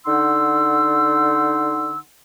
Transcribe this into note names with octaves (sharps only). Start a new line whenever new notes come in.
D3 D#4 F#5 C6 E6